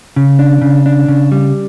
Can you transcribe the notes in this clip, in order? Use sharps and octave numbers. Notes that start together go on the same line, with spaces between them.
C#3
D4
C#3
D4
C#3
G3